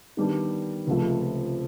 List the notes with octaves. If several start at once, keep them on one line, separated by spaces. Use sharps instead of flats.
D#3 G3 B3 D4 G4
C#2 C3 F3 A3